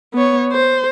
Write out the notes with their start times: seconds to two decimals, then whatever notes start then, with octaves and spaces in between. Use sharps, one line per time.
0.14 B3 C#5
0.52 C5